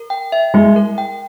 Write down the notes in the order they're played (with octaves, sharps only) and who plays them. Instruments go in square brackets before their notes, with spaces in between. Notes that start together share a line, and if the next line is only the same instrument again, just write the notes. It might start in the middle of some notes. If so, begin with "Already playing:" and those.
Already playing: [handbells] A#4
G5
E5
[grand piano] G#3 [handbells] E4
[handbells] A#4
G5